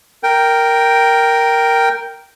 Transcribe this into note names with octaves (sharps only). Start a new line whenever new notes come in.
A#4 G5